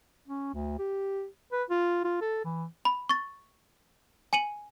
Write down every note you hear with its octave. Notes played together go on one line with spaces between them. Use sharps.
C#4
D2
G4
B4
F4
F4
A4
E3
B5
C#6 A6
G#5 C#7 D#7 F#7